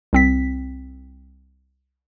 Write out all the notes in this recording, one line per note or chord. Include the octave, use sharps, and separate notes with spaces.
C2 C4 B6